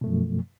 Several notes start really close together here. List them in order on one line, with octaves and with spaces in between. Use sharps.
B2 A3 F#2 F3